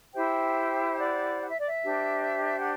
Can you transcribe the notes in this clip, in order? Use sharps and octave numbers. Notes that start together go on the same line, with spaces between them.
E4 G4 C5 E5 G5
G5
D5 F#5
F#5
E5
D5
E5
D4 G4 C5
F#5